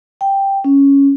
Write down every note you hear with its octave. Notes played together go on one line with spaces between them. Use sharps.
G5
C#4